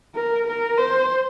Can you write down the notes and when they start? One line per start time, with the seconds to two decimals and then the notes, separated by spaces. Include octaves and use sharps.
0.15 A#4
0.47 A#4
0.78 C5